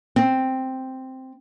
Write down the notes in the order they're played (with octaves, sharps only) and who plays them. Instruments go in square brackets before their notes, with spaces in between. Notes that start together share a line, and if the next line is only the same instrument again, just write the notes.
[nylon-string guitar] C4